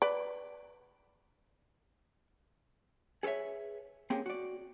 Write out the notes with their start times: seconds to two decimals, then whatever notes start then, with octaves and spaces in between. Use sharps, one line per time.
0.02 B4 D5
3.23 G#4 A4 B4 C#5 E5
4.10 A#3 C4 C#4 G4 G#4 A#4
4.26 F#4 D5